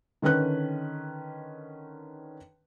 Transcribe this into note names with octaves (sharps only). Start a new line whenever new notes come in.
D3 D#3 C#4 B4 F#6